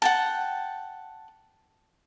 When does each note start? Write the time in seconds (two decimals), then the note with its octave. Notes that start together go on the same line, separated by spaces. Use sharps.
0.02 F#5 G5 A5